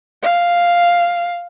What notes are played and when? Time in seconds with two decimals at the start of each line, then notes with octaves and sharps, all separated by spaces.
0.23 F5